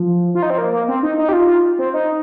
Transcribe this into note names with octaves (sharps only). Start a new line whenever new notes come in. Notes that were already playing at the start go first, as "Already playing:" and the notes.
Already playing: F3
F4
D#4
C4
A#3
A#3
C4
D#4
D#4
G4
F4
F4
C4
D#4